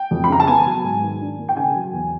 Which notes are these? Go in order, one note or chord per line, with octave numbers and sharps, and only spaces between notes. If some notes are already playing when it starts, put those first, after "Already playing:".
Already playing: G5
F2
B5
C#3 A#5
A5
B3 G#5
F#3
G#2
D#3
D4
A#3
G5
C#3 G#5
F#3
E2